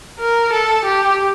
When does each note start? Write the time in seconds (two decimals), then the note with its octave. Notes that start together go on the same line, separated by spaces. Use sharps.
0.19 A#4
0.52 A4
0.85 G4